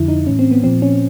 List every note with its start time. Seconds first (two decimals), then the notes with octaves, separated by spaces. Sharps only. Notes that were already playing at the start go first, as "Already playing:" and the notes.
Already playing: F2 D3 F3 E4
0.08 D#4
0.26 A2 E3 C#4
0.39 C4
0.51 B3
0.64 A#2 F3 C4
0.82 C#4